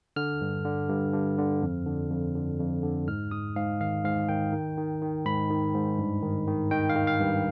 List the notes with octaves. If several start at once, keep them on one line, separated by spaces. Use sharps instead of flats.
D3 F6
G2
D3
G2
G2
D3
F2
D3
F2
D3
F2
D3
G#2 F6
G#2 D#6
G#2 F5
D#3 F5
G#2 F5
D#3 G5
D#3
D#3
D#3
G#2 B5
D#3
G#2
G2
D#3
D#3
D#3 G5
F5
D#3
F5
G2